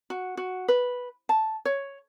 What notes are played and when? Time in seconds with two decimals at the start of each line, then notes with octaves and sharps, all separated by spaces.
0.10 F#4
0.37 F#4
0.68 B4
1.29 A5
1.65 C#5